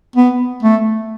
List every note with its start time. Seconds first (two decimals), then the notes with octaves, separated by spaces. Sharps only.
0.16 B3
0.63 A3